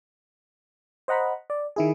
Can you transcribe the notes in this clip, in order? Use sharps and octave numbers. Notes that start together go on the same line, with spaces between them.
C5 D#5 F#5 A#5 B5
D5
D#3 E4 G#4